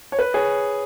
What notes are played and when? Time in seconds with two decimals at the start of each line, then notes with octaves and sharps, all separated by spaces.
0.12 C#5
0.19 B4
0.34 G#4 C#5